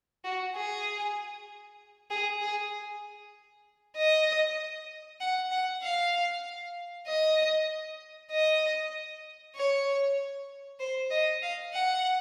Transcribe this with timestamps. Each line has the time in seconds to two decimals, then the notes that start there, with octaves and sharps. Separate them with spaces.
0.24 F#4
0.55 G#4
2.10 G#4
2.41 G#4
3.97 D#5
5.20 F#5
5.52 F#5
5.83 F5
7.07 D#5
8.31 D#5
9.56 C#5
10.80 C5
11.11 D#5
11.42 F5
11.73 F#5